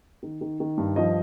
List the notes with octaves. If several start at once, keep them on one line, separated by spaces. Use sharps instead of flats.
D#3
D#3
D#3
G2
F3 D#5